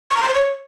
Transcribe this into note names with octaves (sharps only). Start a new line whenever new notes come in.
C#6
A#5
C6
C5
C#5